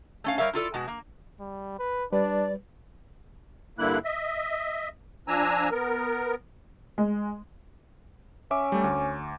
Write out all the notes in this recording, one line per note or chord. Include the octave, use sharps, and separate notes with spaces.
A3 C#4 F5
G3 A#4 C#5 E5 F5
E4 F4 A4 D5
B2 G#3 F#4
A#3
G3
B4
G3 D4 B4 D5
G2 D3 A#3 E4 F#6
D#5 E5
F3 D4 G#5 A#5 E6
B3 A#4
G#3
C#4 E5 D6
G3 A3
D2